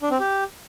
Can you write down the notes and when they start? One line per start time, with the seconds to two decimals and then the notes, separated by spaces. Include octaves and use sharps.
0.02 D4
0.11 C4
0.20 G4